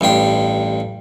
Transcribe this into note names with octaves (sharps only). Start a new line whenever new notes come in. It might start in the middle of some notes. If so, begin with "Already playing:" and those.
A1 G2 G5 C6